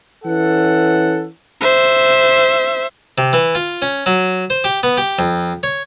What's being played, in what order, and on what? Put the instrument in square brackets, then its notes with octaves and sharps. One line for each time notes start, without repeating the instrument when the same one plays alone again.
[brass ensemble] E3 C#4 A4 F#5
[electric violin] C5 E5
[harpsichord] C3
E3
F4
C#4
F#3
C5
G4
B3
G4
F2
C#5